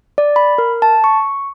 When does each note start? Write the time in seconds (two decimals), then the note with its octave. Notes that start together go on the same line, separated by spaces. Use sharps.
0.18 D5
0.36 B5
0.58 A#4
0.82 A5
1.04 C#6